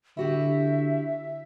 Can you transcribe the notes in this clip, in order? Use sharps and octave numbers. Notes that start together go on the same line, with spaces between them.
D3 E4 F#4 G4 E5